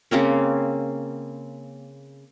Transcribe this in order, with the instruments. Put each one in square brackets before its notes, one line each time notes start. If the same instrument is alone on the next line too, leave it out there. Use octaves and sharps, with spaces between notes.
[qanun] C#3 A#3 C4 C#4